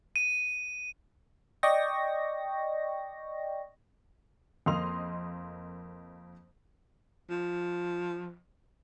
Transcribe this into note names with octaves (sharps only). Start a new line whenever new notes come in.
D#7
D5 D#5 G5 C#6 A#6
F2 A#3 D#5 C6 D#6 F7
F3